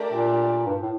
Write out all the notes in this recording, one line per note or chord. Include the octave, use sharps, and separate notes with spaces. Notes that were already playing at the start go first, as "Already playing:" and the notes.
Already playing: A3 D4 G4 A#4 D5
A#2
G2
A2